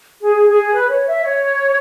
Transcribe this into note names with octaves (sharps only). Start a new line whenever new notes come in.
G#4
G#4
B4
C#5
E5
C#5